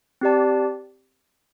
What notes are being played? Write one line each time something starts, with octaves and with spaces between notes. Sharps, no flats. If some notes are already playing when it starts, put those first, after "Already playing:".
C4 G4 D5 A5